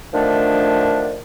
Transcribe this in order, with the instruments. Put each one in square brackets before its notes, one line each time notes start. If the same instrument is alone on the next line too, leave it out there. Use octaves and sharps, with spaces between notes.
[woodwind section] D3 D#3 F3 A3 D4